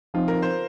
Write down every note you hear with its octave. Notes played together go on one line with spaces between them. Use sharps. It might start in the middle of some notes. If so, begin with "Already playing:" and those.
F3 C4 D#4 F4
A#4
C5